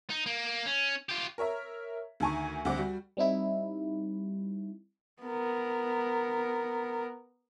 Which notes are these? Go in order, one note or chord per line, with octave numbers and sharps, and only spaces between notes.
D#4
A#3
C#4
F4 G4
A#4 C#5 E5 A#5
D2 D#3 G#5 A#5 C#6
D2 G3 C4 F#5 D6
G3 F#4
G3 C4 D#4 E4
B3 A#4